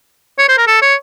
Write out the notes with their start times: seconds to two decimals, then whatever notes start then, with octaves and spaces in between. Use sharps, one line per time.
0.39 C#5
0.49 C5
0.58 A#4
0.68 A4
0.82 C#5